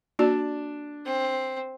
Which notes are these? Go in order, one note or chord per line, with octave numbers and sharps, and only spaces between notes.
A#3 D4 F#4 D5 A5
C4